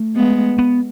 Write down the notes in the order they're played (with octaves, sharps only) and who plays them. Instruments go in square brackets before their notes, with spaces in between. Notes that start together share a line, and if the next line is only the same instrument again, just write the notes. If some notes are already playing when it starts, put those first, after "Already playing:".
Already playing: [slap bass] A3
[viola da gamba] G#3 B3
[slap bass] B3